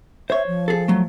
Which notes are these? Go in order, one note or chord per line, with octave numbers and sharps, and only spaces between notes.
C5 C#5 E5
F3
G#4 A4
F#3 A3